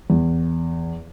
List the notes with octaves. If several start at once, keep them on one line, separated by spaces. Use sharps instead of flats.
E2